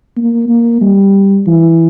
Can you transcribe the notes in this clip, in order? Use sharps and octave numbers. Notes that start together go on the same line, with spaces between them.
A#3
A#3
G3
E3